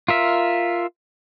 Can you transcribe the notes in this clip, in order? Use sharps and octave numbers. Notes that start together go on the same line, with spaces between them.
F4 A#4 E5